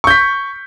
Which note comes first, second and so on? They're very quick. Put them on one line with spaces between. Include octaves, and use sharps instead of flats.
C#6 G6 B6